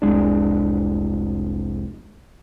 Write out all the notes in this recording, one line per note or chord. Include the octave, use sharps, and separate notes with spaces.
F1 C2 G#3 D4